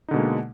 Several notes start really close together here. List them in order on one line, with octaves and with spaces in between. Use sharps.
D#4 D3 B2 G#3 A#3